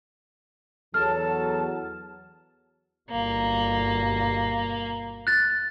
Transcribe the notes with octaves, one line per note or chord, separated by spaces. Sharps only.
E2 F#3 A4 A5 F6
G1 B2 A#3
F#6 A6